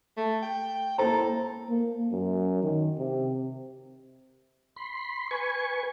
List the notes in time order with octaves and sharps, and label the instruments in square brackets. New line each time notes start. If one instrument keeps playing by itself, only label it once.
[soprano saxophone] A3
G5
[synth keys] A#3 E4 C5 [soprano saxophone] A4 [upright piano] A#5
[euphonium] A#3
F#2
D#3
C3
[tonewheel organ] B5 C6
B4 G#5 C#6